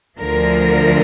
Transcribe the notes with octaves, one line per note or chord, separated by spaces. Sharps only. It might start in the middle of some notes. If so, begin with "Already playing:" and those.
D2 D3 F3 A#4